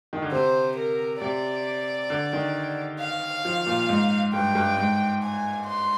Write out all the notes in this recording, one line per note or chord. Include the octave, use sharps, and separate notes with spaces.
D#3
D3
C3 C5
A#4
C3 D5
D3
D#3
F5
F3
A#2
G#2
G2 G5
G2
G#2
G#5
C6